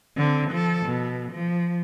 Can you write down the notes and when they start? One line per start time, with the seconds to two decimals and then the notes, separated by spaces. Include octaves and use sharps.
0.17 D3 C4
0.51 F3 A4
0.86 B2
1.32 F3